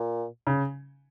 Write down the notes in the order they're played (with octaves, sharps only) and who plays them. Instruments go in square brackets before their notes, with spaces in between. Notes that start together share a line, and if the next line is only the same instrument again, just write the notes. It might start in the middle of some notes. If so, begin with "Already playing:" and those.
Already playing: [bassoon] A#2
[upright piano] C#3